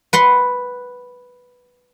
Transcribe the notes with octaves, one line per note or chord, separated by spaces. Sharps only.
B4 F#5 C6